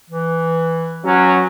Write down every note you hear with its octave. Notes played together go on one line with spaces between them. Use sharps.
E3
F#3 C#4